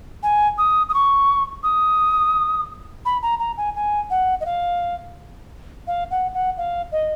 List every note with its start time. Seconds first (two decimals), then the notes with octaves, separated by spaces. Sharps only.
0.23 G#5
0.58 D#6
0.89 D#6
0.94 C#6
1.63 D#6
3.05 B5
3.22 A#5
3.39 A#5
3.57 G#5
3.75 G#5
4.10 F#5
4.40 D#5
4.46 F5
5.87 F5
6.11 F#5
6.34 F#5
6.57 F5
6.92 D#5